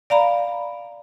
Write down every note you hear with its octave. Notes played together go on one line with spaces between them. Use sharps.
D5 F5 A#5 B5